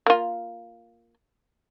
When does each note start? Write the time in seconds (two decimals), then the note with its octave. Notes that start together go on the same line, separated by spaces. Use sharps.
0.06 A#3 F4